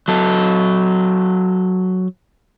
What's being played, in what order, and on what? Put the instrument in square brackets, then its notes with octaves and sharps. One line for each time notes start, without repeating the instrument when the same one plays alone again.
[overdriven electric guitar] F#3 A4